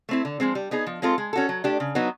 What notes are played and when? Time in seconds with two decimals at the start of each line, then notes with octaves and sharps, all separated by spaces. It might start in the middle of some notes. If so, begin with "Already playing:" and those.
0.09 A3 C4 E4
0.25 D3
0.40 F3 G#3 C4
0.55 G3
0.71 B3 D#4 G#4
0.87 F3
1.02 G#3 C4 F4 A4
1.18 G#3
1.33 C#4 F#4 A4
1.49 F#3
1.64 A3 D4 G4
1.80 C#3
1.95 F#3 B3 D#4